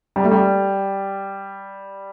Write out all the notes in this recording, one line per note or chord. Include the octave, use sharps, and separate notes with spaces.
G3
A3
G3